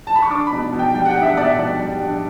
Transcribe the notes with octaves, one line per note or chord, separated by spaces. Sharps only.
A5
B5
C#6
D4 D6
B5
B2
B2
G5
G3 G5
F#5
G5
D4
E5
F#5
B2 D5
E5
B2 D5
G3
D4